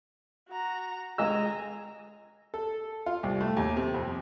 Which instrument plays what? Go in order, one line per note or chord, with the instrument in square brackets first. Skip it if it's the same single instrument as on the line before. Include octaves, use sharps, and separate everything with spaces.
[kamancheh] F#4 A#5
[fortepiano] G#3 D#5 E6 [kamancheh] G#5 A#5
[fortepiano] A4
F4
C2
A3
D#2
C3
F2